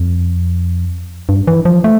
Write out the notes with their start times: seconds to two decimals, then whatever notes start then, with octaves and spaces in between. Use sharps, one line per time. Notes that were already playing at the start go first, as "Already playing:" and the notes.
Already playing: F2
1.29 G2
1.47 E3
1.65 F3
1.84 A3